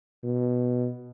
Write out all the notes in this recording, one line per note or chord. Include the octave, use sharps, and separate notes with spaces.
B2